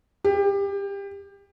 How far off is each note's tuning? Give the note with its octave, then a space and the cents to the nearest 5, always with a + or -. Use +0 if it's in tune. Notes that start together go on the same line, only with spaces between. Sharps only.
G4 +25